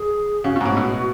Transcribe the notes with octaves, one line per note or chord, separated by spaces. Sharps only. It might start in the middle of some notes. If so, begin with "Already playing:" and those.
Already playing: G#4
C#3 F#4
B2
G#2
A2
B2